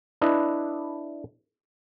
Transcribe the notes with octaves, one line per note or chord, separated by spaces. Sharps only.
D4 E4 B4 D#5